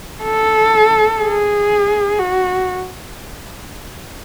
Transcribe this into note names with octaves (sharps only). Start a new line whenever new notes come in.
A4
G#4
F#4